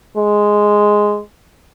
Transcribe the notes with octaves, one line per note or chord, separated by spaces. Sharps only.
G#3